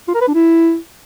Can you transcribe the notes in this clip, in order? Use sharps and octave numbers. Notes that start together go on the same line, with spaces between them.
F4
A#4
B4
D4
E4